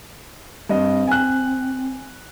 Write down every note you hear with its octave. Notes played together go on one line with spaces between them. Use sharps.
G2 C4 D#5
G#5 F#6